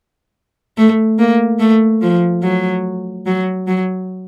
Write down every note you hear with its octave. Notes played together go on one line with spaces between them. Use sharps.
A3
A#3
A3
F3
F#3
F#3
F#3